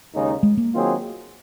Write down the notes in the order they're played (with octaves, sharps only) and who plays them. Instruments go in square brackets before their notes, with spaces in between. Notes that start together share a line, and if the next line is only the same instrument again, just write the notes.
[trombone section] D#2 C#3 G#3 D#4
[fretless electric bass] G#3
A#3
[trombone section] D#3 F#3 C4 F4 G#4